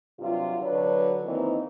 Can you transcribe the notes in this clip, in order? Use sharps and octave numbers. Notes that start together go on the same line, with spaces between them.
G2 C3 F#3 F4
D3 F#3 D4 B4 C#5
D#3 E3 A#3 C4 D#4 C5